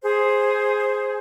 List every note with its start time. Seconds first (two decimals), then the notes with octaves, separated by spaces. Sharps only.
0.03 G#4 C5